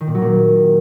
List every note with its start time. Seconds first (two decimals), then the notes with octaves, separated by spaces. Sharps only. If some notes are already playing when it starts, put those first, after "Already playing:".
0.01 D#3
0.08 A#2
0.15 F#3
0.22 A#2